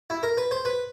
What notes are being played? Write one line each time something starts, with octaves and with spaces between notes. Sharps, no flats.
E4
A#4
B4
C5
B4